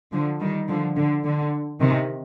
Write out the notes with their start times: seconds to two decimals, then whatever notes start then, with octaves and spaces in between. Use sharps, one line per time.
0.13 D3 F3
0.41 D#3 G3
0.69 D3 F3
0.97 D3
1.25 D3
1.81 C3 D#3